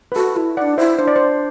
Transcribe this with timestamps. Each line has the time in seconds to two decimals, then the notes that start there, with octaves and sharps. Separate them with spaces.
0.12 B4
0.16 F#4 A4
0.36 E4 A4
0.57 E4 D5 F#5
0.61 D4
0.78 E4 C5 E5
0.99 D4 C5
1.07 D5
1.16 C5